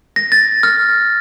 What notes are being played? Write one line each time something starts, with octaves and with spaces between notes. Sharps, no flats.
A#6
A6
F6